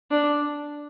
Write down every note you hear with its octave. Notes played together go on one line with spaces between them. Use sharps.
D4